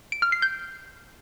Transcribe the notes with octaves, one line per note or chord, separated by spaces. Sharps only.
D7
F6
C7
G6